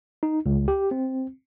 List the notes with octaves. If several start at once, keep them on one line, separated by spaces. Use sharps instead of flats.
D#4
C#2
G4
C4